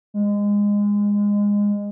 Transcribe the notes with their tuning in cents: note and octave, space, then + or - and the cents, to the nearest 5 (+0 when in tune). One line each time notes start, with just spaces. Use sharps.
G#3 -20